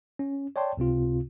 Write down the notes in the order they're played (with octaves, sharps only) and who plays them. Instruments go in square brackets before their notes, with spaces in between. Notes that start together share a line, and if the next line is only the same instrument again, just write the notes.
[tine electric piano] C#4
C#5 D5 G5 A5 C6
C#2 C3 C4 F4